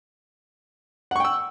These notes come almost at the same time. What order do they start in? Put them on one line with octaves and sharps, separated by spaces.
F#5 C#6 G5 E6